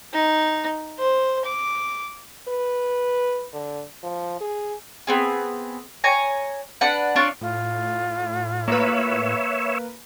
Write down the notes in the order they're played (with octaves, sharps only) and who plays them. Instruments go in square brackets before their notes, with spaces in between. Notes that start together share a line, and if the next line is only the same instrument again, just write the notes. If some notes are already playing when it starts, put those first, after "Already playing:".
[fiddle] D#4
C5
D6
[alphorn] B4
D3
F3
G#4
[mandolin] B3 C4 G#4
C#5 G#5 A#5
D4 B4 D5 F#5
D4 F4 C#5 D5
[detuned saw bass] A2 [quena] F4
[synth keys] A#3 B4 [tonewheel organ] C#5 E5